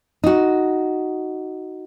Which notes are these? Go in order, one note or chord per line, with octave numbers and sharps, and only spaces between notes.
D#4 F#4